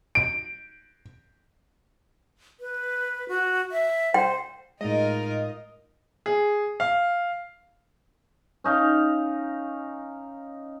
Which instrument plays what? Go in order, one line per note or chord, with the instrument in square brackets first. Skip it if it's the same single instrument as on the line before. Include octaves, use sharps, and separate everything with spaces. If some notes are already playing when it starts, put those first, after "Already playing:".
[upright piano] D7
[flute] B4
F#4
E5
[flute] C5 [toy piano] G5
[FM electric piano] A2 G#3 [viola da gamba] D#4 F4 A#4 [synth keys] D#5
[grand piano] G#4
F5
[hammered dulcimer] C#4 D#4 F5